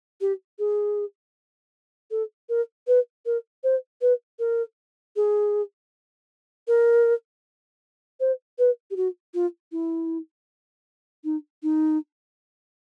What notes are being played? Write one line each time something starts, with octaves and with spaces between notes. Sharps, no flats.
G4
G#4
A4
A#4
B4
A#4
C5
B4
A#4
G#4
A#4
C5
B4
G4
F#4
F4
E4
D#4
D#4